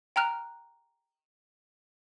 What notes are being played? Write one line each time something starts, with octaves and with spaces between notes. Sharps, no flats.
G5 A#5 F6 F#6